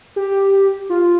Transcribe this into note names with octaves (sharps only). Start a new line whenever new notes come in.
G4
F4